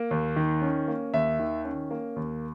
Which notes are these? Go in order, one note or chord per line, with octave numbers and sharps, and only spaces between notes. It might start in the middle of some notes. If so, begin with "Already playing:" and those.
Already playing: A#3
D#2
D#3
C#4
A#3
D#2 E5
D#3
C#4
A#3
D#2